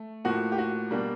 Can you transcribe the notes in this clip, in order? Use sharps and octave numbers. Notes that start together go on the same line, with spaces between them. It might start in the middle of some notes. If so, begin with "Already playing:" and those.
Already playing: A3
A2 F3 A#3 F#4
G4
F#4
B2 G3 A#3 D4